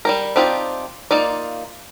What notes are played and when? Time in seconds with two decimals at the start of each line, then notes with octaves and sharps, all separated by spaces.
0.05 G3 G4 A#4
0.36 C4 D4 D#4 F4 G4
1.11 A#3 D#4 F4 D5